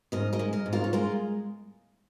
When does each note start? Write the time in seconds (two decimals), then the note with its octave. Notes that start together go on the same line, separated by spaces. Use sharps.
0.12 G#2 A#4 D#5
0.33 A#4 D#5
0.39 G#3
0.53 A#4 D#5
0.66 G#2
0.73 F4 A#4
0.84 C#5
0.93 G#3 F4 A#4